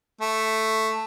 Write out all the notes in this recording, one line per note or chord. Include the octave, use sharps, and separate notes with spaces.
A3